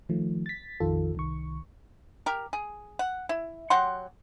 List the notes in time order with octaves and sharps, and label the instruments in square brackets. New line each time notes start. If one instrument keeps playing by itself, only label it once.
[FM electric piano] D#3 F3 A3
A6 B6
A#1 F2 D#3 F4 A4
C2 D#3 C#6
[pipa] G4 A#4
G#4
F#5
E4
F#3 G4 F#5 C6